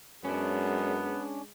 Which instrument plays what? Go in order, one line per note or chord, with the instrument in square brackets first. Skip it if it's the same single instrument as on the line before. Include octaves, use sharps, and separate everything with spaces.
[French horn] F#2 [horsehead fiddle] G#3 [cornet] B3 [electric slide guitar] C#4 D4